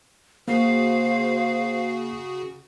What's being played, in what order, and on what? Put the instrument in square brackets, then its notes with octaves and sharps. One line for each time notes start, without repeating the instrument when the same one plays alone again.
[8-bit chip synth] C#3 F#4 G#4 [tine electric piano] A#3 [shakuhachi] C5 [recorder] F5